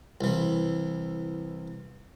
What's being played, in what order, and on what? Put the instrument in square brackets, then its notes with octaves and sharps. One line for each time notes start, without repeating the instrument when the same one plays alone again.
[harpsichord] C2 E3